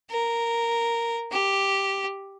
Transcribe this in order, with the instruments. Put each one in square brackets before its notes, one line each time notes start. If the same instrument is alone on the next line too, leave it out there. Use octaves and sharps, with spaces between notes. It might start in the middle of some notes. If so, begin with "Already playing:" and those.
[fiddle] A#4
G4